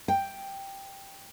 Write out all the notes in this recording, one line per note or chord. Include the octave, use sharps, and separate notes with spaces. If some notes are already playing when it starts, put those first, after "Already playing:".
G5